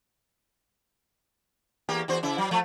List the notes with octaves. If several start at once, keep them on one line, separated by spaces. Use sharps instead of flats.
E2 A#3 G4
E2 F#4 C5
C#3 E4
F#3
F3 A3